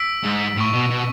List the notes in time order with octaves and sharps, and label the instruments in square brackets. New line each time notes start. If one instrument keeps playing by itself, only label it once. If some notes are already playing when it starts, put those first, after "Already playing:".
Already playing: [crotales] E6 B6 D7
[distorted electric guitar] G#2
[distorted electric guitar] A2 [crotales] C#6 E6 B6
[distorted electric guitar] B2
B2